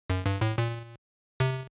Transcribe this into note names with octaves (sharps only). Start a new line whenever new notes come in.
F#2
G2
A2
A#2
C3